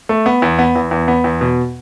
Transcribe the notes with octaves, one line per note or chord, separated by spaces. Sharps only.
A3
B3
E2
B3
E2
E2
B3
E2
B2